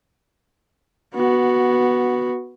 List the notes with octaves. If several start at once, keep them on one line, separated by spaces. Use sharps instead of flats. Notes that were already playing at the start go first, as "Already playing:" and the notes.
B3 F#4